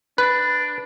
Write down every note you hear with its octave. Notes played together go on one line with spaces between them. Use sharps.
D4 B4